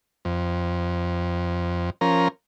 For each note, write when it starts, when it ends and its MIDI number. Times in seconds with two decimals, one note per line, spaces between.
0.25 1.90 41
2.01 2.28 53
2.01 2.28 61
2.01 2.28 70
2.01 2.28 82